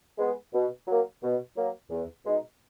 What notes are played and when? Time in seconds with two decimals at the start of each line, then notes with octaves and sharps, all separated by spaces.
0.18 G#3 B3
0.53 B2
0.87 F#3 A#3
1.22 B2
1.56 F#3 A#3
1.89 E2
2.25 B2 G#3 D#4